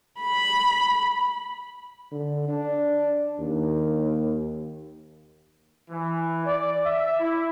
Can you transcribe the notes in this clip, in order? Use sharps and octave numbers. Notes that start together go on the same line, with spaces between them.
B5
D3
D4
D#2
E3
D5
E5
E4